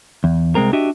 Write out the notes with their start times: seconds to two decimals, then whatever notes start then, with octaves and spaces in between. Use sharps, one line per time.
0.24 E2
0.55 C2 F#2 G#3 C4 A#4
0.73 D4 F#4 G4 D#5 E5